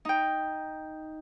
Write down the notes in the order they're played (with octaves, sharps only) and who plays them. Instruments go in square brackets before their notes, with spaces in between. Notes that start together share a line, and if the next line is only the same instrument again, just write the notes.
[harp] D#4 G5